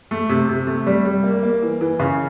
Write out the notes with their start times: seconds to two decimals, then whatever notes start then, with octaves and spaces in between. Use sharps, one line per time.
0.11 A3
0.29 C3
0.49 C3
0.67 A3
0.87 G3
1.05 G3
1.24 A#3
1.43 A#3
1.62 E3
1.81 E3
2.00 C#3